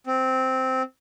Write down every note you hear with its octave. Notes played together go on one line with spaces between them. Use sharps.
C4